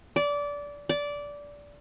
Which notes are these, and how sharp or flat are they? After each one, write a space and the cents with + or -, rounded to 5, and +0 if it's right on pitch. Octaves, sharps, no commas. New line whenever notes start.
D5 -20
D5 -15